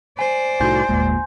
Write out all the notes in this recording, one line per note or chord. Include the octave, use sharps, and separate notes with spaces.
C5 D5 G#5
C2 A2 D#4 F#4 G#5 C6 G6
G1 D#2 A#2 G#3